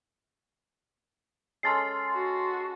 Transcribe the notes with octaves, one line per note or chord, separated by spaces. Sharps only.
G#3 C#4 A4 C6 A6 C7
F#4